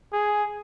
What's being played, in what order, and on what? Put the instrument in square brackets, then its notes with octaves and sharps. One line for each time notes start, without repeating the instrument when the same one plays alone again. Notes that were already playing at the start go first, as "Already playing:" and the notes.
[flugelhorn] G#4